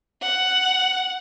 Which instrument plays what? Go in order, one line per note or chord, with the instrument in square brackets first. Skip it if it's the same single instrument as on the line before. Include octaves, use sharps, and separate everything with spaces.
[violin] F#5